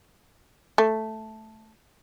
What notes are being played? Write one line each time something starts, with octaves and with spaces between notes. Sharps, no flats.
A3